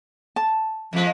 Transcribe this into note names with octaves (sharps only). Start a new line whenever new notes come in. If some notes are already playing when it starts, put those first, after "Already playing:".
A5
F2 F3 G#3